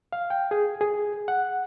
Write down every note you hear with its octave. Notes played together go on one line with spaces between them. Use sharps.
F5
G5
G#4
G#4
F#5